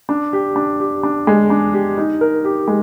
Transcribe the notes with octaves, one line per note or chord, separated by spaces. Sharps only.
D4
G4
D4
G4
D4
G#3
D4
G4
D#4
A#4
G4
G#3